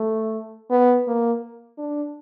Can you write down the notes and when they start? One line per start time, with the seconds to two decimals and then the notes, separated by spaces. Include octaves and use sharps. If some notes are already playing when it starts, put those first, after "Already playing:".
Already playing: A3
0.71 B3
1.07 A#3
1.78 D4